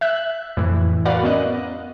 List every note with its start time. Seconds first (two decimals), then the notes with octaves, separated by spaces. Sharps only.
0.01 E5 F#6
0.57 F2 A2 E3
1.05 F#4 A#4 B4 D5 F5 F#5
1.23 B3 C#4 D#5 F#6